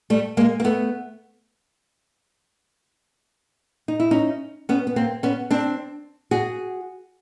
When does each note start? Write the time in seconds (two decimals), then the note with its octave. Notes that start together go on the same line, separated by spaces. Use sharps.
0.10 G3 A3
0.37 G#3 A#3
0.60 A#3
0.64 A3 B3
3.88 D#4
4.00 E4
4.11 C#4 D#4
4.69 B3 C#4
4.87 B3
4.96 A#3 C4
5.23 B3 C#4
5.51 C4 D4
6.31 F#4 G#4